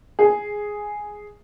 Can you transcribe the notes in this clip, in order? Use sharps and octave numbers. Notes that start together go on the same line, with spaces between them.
G#4